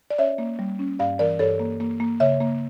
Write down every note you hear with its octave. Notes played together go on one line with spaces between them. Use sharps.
D5
C#4 C#5 E5
A#3
G3
C#4
G2 D5 F5
E3 A#4 D5
G2 A4 C#5
A#3
A#3
A#3
C#3 C#5 E5
A#3